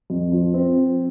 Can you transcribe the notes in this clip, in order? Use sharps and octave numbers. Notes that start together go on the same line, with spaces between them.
F2
F3
C4